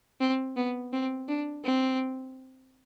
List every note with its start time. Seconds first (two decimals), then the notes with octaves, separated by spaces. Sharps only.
0.21 C4
0.57 B3
0.93 C4
1.29 D4
1.64 C4